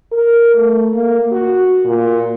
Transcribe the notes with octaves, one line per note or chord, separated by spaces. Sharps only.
A#4
A3
A#3
F#4
A#2